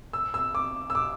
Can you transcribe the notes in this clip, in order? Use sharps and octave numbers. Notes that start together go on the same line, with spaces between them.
E6
E6
D6
E6
D6